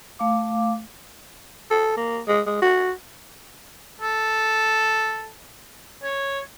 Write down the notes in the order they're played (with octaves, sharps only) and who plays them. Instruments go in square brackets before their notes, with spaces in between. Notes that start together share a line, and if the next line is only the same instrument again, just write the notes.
[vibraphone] A3 F5 D6
[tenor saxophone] A4
A#3
G#3
G#3
F#4
[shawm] A4
C#5